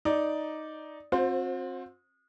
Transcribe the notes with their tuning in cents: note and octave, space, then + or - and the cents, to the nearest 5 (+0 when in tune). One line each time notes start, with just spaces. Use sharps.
D#4 +0 D5 +0
C4 +25 F#4 -45 C5 +0